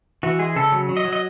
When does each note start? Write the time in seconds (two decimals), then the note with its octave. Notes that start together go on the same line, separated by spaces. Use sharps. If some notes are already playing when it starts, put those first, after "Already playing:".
0.23 E3 F#4
0.39 G#3 G#4
0.56 C#3 A4
0.72 F#3
0.89 F#3
0.97 D#5
1.05 F#3
1.13 D#5